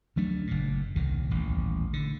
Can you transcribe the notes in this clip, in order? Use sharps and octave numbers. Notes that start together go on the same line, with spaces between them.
D2 F#3 A3 D4
F#1 A#2
D#1 C2 D#3
D#1 A1
D3